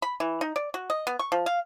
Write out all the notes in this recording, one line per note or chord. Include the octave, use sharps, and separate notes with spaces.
B5
E3
D#4
D5
F#4
D#5
B3
C#6
F3
F5